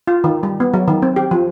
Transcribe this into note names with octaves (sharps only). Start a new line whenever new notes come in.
F4
D#3
G3
B3
F#3
D#3
C4
G4
F3